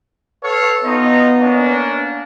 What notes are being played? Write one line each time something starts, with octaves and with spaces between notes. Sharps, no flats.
A4 B4 C#5 F5
B3 D#4 F4 D#5
A#3 C#4 D4